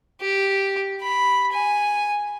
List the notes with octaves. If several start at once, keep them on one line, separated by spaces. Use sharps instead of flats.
G4
B5
G#5